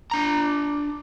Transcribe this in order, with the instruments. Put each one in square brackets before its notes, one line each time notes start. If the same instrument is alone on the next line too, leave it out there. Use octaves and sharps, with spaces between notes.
[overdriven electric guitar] D4 A#5